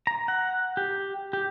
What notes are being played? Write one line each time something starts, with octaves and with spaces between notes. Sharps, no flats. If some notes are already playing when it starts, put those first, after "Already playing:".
A#5
F#5
G4
G4